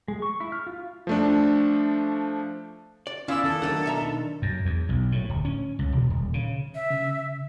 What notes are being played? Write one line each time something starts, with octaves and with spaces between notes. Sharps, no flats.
G#3
C#6
E4
F6
F4
F3 A3 D4
D5
B3 C#4 E4 F4 D5 E6
D#3 A4
F#3 A3 D4 A#4 F#5
B1 E5 A#5
D#4
F#2
E2
B1
A2
D1
C#4
C#2
E1
D#1
C#3
E5
C#3